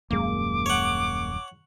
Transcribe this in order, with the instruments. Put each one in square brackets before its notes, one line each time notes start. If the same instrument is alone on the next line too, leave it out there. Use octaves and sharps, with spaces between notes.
[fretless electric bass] D#1 F#2 G#3 [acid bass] A#3 [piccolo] D6
[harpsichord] C#5 F#5